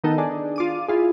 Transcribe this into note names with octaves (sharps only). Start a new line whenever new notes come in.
D#3 B3 D#4 A4
D4 G#4 D5
F4 D6 D#7
E4 F4 G#4